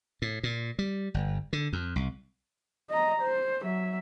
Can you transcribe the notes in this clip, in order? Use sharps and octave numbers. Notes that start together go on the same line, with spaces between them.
A2
A#2
G3
G1
D3
F2
C2
D#5 A#5
C5
F#3 E5